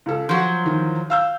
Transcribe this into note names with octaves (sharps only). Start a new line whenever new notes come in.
C#2 A4
F3 F#3 F#4 G6
E2 D#3 E3
F5 E6 G6